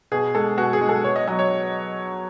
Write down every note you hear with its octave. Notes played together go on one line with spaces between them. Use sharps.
B2 G#4
G#3 A4
B2 F#4
G#4
G#3
A4
B2 C#5
D#5
F#3 D#5
C#5